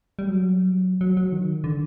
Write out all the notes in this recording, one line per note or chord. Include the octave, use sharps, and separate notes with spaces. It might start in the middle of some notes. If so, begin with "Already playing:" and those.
G3
F#3
F#3
F#3
D#3
D3